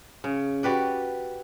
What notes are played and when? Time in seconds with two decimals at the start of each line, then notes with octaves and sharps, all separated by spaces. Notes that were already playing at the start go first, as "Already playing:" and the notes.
0.24 C#3
0.63 F#4 G4 B4 D5